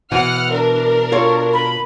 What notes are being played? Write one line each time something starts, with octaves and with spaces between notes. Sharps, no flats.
B2 E3 F#5 F6
D4 A#4
F4 A4 C#5
B5